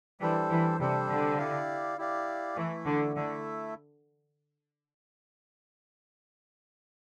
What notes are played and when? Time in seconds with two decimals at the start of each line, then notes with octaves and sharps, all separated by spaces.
0.20 E3 G3 D4 A4 C5
0.50 E3
0.79 C3 G3 D4 A4 C5
1.09 D3
1.38 E4 G4 D5 F5
1.98 E4 G4 D5 F5
2.56 E3 A3 E4 A4 E5
2.86 D3
3.16 D3 A3 E4 A4 E5